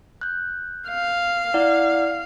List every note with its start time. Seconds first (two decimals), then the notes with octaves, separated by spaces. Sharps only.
0.21 F#6 G6
0.88 F5
1.54 E4 D5 F#5